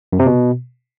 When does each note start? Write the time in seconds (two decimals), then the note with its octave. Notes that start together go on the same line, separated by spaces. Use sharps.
0.13 F#2
0.19 C3
0.26 B2